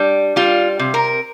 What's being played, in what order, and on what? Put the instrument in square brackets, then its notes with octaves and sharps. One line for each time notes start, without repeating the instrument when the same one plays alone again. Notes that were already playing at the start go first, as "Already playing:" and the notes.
Already playing: [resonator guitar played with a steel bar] G3 D4
G3 F4
C3
A#4